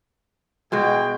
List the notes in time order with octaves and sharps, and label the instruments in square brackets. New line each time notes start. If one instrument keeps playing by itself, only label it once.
[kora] B2 G#3 F#4 [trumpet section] E4 G#4 G5